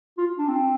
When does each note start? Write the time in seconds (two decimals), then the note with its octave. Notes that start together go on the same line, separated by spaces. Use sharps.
0.18 F4
0.38 D4
0.48 C4